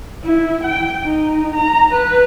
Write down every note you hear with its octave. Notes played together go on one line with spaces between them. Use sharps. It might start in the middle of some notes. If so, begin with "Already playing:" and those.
E4
G5
D#4
A#5
B4